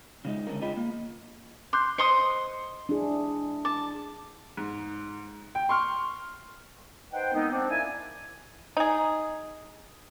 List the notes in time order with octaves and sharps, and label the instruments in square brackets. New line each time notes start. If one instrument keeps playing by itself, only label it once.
[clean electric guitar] C#3 G#3 D#4
D3 G#3 C#4 A#4
F4 G#4 D#5 G5 B5
A#3
[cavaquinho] C6 [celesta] D6 F#6 G6
[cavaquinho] C5 C6 D#6 [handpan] D#5 [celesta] C#7
[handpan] D4 E4 G#4
[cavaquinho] A5 [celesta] D6
[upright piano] G#2
G5
C6 C#6 F6
[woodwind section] D#4 B4 C5 F#5 G5
D#3 G#3 B3 C4 D#4
C4 D4
A#3 E4 D5 E5 G#5
[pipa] D#4 G#4